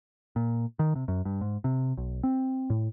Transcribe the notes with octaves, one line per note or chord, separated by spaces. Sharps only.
A#2
D#3
C3
F#2
G2
G#2
C3
B1
C4
A2